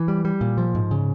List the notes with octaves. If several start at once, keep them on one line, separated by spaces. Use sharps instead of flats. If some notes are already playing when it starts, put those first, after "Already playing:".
Already playing: E3
G3
G3
A#2
F3
G#2
C#3